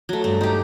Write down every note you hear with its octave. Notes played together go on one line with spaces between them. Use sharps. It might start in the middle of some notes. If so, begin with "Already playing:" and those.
F#3 A3
G2 A3
D#4 G4